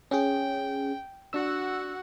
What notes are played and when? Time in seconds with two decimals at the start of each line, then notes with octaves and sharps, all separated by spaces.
0.11 C#4 G#4 G5
1.33 D4 F#4 F#5 E6